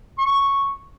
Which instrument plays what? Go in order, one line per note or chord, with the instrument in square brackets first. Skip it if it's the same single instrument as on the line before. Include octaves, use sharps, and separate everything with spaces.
[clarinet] C#6